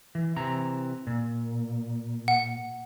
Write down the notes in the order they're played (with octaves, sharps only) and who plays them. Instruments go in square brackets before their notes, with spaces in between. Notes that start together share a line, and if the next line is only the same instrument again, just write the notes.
[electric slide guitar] E3
C3 E3 A#5
A#2
[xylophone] F#5